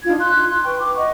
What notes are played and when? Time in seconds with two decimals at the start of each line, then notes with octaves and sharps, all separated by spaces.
0.04 D4 D#4 F4 G#6
0.20 C6 F#6 G6
0.46 C6
0.65 B4 G5 C#6
0.80 D6
0.95 D#5 F#5 C#6